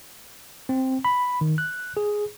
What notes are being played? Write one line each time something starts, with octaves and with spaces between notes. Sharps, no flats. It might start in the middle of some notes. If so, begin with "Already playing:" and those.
C4
B5
D#3
F#6
G#4